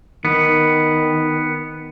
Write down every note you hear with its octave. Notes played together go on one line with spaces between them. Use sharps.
D#3 B3